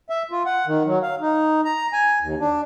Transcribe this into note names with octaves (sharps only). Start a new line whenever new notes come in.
E5
F4
F#5
D#3
F#3
F5
D#4
A#5
G#5
D#2
D4